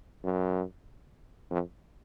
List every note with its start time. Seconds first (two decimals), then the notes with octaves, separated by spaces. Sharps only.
0.24 F#2
1.51 F2